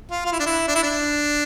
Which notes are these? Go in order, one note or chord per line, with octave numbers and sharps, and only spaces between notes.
F4
F4
E4
D4
E4
D4
E4
D4